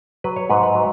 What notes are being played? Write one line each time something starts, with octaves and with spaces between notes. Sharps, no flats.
F#3 B4
C#5
G#2 B4
B4
F#3